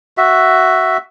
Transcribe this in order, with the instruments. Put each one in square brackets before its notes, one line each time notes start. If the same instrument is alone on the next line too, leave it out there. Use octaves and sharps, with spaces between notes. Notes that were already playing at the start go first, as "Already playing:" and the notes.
[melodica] F#4 E5